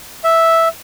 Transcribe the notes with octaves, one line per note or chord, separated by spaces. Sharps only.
E5